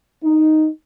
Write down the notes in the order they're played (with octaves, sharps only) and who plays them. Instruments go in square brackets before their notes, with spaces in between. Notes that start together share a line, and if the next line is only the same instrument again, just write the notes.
[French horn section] D#4